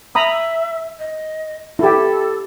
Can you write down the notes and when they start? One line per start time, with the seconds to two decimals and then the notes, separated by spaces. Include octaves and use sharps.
0.15 E5 A#5 B5 D#6
0.99 D#5
1.79 E4 G4 A4